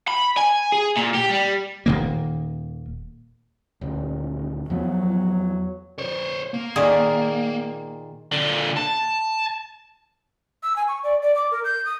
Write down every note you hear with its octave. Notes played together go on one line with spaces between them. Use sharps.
B5
G#5
G#4
A#2
G4
G3
D#1 D#3 A#3
D#1 D2
E2 F3 F#3 B3
C5 C#5
A#3
A#2 D#3 G#4
A#2 D3
A5
E6
G#5
C#6
D5
D5
D6
A#4
G6
D#6